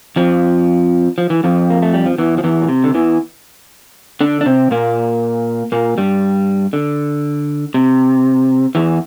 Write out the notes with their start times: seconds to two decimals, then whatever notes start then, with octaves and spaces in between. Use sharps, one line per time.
0.16 F2 F3
1.18 F3
1.30 E3
1.44 F2 F3
1.70 A#3
1.82 A3
1.94 G3
2.06 F3
2.18 E2 E3
2.38 F3
2.44 E2 E3
2.62 A#2
2.69 C3
2.84 D3
2.94 E2 E3
4.21 D3 D4
4.41 D4
4.46 C3 C4
4.71 A#2 A#3
5.72 A#2 A#3
5.98 G2 G3
6.73 D3
7.74 C3
8.75 E2 E3